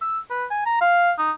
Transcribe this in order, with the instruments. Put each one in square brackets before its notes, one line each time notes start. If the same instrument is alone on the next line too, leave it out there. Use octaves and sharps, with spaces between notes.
[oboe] E6
B4
G#5
A#5
F5
D#4